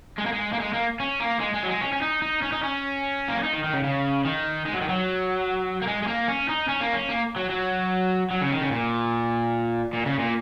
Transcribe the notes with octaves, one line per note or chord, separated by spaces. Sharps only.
G#3
A#3
G#3
A#3
G#3
A#3
C#4
A#3
G#3
G#3
F#3
G#3
C#4
C#4
D#4
D#4
C#4
D#4
C#4
A#3
C#4
D#4
D#3
D#3
C#3
C#3
D#3
G#3
F#3
D#3
F#3
A#3
G#3
G#3
A#3
C#4
D#4
C#4
A#3
C#4
A#3
F#3
F#3
F#3
C#3
D#3
C#3
A#2
A#2
C#3
A#2